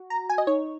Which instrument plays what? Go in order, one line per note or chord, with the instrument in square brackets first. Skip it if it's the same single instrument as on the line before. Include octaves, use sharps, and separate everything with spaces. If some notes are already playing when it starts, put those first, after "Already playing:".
Already playing: [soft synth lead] F#4
[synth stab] A#5
G#5
D#5
[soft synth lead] D#4 [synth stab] C#5